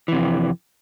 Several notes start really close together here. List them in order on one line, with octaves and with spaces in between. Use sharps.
E3 C3 F2